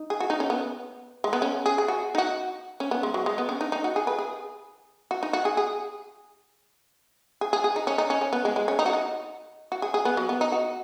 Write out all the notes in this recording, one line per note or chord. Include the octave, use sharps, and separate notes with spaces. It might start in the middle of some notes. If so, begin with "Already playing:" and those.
Already playing: D#4
G#4
F#4
D#4
C#4
B3
G#3
B3
C#4
G#4
G#4
F#4
D#4
F#4
C#4
B3
G#3
F#3
G#3
B3
C#4
D#4
D#4
F#4
G#4
B4
G#4
F#4
D#4
F#4
G#4
G#4
G#4
G#4
G#4
D#4
C#4
D#4
C#4
C#4
B3
G#3
G#3
C#4
D#4
F#4
D#4
F#4
G#4
G#4
B3
F#3
B3
D#4
F#4